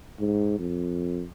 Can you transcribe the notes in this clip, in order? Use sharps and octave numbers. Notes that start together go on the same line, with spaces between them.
G#2
F2